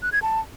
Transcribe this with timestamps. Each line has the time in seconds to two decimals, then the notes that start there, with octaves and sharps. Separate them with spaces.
0.02 F#6
0.12 G#6
0.22 A5